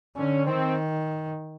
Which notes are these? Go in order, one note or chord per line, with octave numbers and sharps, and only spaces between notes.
D3 C#4
D#3 C4